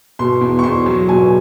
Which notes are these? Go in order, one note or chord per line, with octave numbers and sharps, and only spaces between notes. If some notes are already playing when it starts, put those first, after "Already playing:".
B2 C6
E2
C#6
E2 C6
F#3
B2 G#5